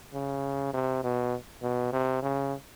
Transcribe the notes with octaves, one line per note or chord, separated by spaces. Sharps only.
C#3
C3
B2
B2
C3
C#3